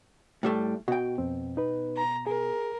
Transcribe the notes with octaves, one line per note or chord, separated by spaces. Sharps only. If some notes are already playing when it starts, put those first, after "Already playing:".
A2 G3 A3
B2 F#4 G5
F2 C4
D#4 B4
A#5
G#4 A#4